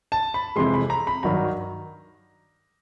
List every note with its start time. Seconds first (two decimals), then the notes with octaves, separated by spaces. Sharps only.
0.12 A5
0.34 B5
0.56 F2 C3 E3 G#3 C6
0.74 B5
0.90 A#5
1.07 B5
1.23 G2 D#3 F#3 A#5